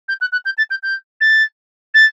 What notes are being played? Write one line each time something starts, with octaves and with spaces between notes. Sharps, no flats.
G6
F#6
F#6
G6
A6
G6
G6
A6
A6